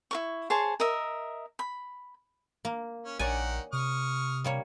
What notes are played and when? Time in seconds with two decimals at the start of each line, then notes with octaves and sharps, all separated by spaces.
0.11 E4 A#4 C#6
0.50 G#4 C5 C#5 A5
0.80 A#4 D#5 E5
1.59 B5
2.65 A#3
3.05 C#4
3.19 A#1 D#3 C#5 D5 F#5 G#5
3.73 C3 C#6 D#6 F6
4.44 G3 A#3 C#5